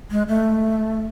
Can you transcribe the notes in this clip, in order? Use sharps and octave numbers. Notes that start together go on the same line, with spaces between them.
G#3
A3